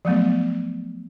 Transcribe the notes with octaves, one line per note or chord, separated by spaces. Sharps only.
F3 F#3 A3 B3